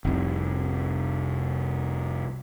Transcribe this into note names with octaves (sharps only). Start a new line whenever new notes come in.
F1 C2